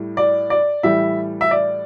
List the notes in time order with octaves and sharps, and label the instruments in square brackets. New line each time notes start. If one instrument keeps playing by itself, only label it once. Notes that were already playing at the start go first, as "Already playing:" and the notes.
Already playing: [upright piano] A2 G3
D5
D5
A2 E3 G3 E5
E5
D5